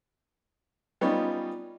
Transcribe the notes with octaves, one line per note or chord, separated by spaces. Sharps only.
G3 B3 C#4 D#4 F4